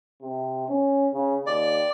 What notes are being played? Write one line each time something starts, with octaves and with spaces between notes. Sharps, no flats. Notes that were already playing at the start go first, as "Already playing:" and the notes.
C3
C#4
C#3
D#2 D5